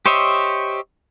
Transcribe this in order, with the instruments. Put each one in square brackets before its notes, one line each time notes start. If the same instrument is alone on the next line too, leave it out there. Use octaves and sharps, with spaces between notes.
[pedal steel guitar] G4 C5 C#5 D#5 E5